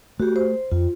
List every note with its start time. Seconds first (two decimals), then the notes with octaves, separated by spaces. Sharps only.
0.20 A3 F#4 G4
0.36 C5
0.72 F2 F4